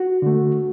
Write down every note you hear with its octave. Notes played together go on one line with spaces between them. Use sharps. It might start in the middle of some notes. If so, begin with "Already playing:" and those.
Already playing: F#4
D3 A3